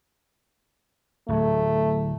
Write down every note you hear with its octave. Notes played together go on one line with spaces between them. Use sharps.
D1 F#3 A3